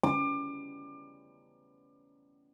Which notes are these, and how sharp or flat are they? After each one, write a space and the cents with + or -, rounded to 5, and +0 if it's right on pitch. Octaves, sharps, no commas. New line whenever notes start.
D6 +30